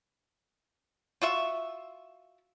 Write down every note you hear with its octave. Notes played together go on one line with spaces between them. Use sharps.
F4 F#4 E5